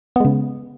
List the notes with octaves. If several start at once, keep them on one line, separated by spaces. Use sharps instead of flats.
C#3 G#3 B3